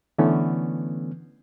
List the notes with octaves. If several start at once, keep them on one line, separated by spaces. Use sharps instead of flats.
D3 E3 A3 B3 C#4